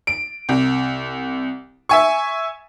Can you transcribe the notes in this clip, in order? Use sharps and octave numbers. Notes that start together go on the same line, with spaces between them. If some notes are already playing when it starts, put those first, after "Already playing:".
D7
C2
E5 G#5 C#6